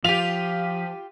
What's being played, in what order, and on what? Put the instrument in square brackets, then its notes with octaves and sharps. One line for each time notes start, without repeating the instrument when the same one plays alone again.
[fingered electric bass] F3 [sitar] F4 G4 [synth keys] F5 B6 D#7 [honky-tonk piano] F7